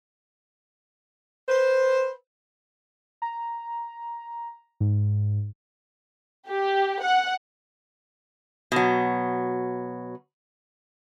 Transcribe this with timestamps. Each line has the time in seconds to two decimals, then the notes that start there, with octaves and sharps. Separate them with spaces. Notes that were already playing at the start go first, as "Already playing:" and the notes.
1.49 B4 C5
3.22 A#5
4.80 G#2
6.48 G4
7.02 F#5
8.72 B2 F#3